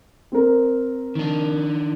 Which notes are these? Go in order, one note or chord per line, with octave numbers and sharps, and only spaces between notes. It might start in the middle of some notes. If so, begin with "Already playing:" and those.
C4 A#4
D#3 D4